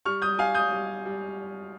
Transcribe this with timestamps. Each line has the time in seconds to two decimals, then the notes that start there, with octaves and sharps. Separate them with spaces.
0.05 G3 C#6 F6
0.22 D#6 G6
0.38 G3 F5 G#5
0.55 D#6 G6
0.72 G3
1.05 G3